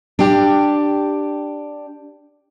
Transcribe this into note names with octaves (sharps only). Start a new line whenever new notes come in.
D4 G4